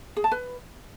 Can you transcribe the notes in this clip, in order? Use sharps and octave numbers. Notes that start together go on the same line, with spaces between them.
G#4
A5
B4